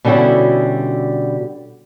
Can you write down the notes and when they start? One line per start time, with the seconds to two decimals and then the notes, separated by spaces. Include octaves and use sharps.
0.05 B2 D3 G3 C#4 E4 F#4